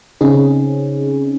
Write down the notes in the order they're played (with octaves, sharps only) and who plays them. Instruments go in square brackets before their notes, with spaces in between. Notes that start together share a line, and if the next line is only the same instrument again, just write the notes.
[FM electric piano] C#3 C4 C#4 D#4 G#4